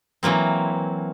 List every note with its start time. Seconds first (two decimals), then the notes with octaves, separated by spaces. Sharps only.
0.23 E3 F#3 A#3 C4